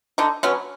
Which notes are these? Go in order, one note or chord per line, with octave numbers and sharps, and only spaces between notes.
D3 D#4
F#3 B3 C#4